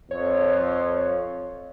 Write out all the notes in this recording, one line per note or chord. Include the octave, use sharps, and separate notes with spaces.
F2 C#5